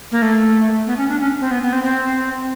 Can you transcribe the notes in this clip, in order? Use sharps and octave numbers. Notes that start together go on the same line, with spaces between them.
A#3
A3
B3
C#4
D4
C#4
C4
B3
B3
C4
C4